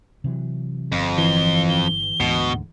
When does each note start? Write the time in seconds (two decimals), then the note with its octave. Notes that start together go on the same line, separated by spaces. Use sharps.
0.24 C3 E3 F#3
0.92 G1 F2
1.18 E3 G7
1.69 G7
2.20 D2 G#2 B2 D3